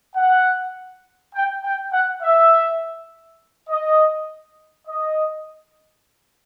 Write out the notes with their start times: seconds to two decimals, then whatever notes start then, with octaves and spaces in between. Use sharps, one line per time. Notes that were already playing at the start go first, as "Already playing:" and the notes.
0.16 F#5
1.35 G5
1.64 G5
1.93 F#5
2.23 E5
3.69 D#5
4.87 D#5